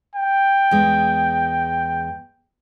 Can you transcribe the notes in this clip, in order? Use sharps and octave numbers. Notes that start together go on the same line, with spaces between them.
G5
E2 G#3